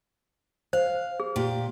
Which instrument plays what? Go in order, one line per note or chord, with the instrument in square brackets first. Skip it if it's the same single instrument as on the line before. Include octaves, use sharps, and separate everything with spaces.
[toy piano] C5 [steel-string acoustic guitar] F5
[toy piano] G#4
[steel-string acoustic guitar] A#2 G4